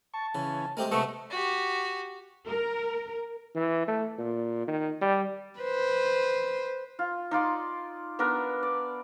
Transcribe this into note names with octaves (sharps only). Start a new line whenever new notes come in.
A5 C#6
C#3 E3 C#4
G#3 A3 C4 G4 A#4
C3 G#3 A3 B3 D#5 C#6 E6
F#4 G4
A#4
E3
A3
A#2
D#3
G3
B4 C5
F4
D#4 F4 D5 C6
B3 D4 A#4
D5